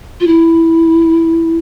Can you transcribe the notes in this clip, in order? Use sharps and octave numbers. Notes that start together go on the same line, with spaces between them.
F4
E4